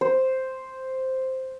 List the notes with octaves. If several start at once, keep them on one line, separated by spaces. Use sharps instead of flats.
C5